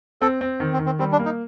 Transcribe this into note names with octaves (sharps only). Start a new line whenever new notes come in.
C4 A4
C4
D#3
C4
D#3
C4
G3 C4
D4
A#3
D#4